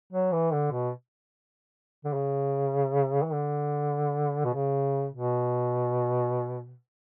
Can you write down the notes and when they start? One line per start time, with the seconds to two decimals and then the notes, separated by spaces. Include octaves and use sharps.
0.13 F#3
0.32 E3
0.53 D3
0.72 B2
2.05 D3
2.14 C#3
3.23 E3
3.33 D3
4.45 B2
4.54 C#3
5.14 B2